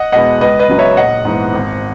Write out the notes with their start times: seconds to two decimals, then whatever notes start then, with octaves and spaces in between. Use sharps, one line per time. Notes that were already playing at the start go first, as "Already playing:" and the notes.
Already playing: D#5 F#5
0.12 E2 B2 G#3 B3 D#5 F#5
0.41 C#2 B4 D#5
0.59 B4 D#5
0.69 C#3 F#3
0.79 C#5 E5
0.97 A#1 D#5 F#5
1.25 G#2 E3 B3
1.54 G#1